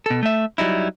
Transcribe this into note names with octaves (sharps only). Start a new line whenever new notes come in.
B2 A4
A3 E5
F#3 G3 D#4 E4